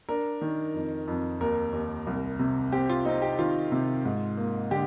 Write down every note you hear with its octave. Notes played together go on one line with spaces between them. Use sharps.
D4 A#4
D#3
F2
F2
D#2 A#4
D#2
C2
C3
C4 G4
F4
C4 D#4
G4
D#3 F4
C3
G#2
A#3
D3 G4